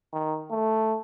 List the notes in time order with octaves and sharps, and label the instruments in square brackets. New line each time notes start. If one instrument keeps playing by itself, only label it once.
[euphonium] D#3
A3